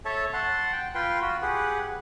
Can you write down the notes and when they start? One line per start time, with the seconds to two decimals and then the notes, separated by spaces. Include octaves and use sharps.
0.05 A4 C#5 E5 A5
0.33 F#5 A5 C6
0.72 G5
0.95 F4 B4 G5 C6
1.22 F4 F#4
1.42 G4 G#4 B4 F#5